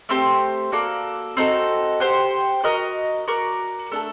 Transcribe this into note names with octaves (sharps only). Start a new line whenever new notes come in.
A3 C4 G4 C5
A#3 F#4 A4 D5
C4 D#4 F#4 A4
G4 C5 F#5
F#4 A#4 D#5
F#4 A#4 D5
A3 D4 A4